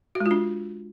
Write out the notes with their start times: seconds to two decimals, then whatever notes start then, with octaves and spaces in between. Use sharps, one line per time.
0.15 F#4
0.20 G#3
0.26 F4
0.31 D4